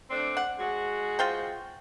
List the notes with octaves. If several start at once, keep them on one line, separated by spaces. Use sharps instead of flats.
A3 C4 D4
F#5
G#3 F#4
F4 C5 G5